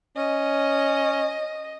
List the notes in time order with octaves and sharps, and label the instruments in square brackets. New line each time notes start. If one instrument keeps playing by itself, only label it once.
[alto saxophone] C#4 [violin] D#5